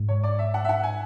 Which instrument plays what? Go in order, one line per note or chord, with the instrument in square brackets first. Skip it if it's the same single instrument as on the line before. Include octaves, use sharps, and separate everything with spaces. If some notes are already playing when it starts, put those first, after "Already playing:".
Already playing: [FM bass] G#2
[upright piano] C#5
D5
E5
F#5
E5
F#5
G#5